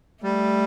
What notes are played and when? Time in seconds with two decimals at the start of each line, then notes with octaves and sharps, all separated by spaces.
0.23 G3 A3